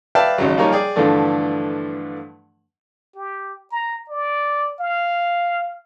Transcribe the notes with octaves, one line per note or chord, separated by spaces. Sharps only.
B4 D5 E5 F5 G5 A5
G#1 C#3 F#3
F3 G3 A#3 D#4 A#4 C#5
G#4 D5 G5
G2 D3 E3 F3 A3 D4
G4
A#5
D5
F5